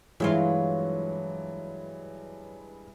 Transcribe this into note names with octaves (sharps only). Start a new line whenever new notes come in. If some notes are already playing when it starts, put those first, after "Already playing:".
G2 E3 F#3 G#3 E4 F4